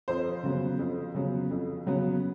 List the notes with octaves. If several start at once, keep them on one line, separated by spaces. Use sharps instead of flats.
F2 C5
C#3 F#3 B3
F2
C#3 F#3 B3
F2
C#3 F#3 B3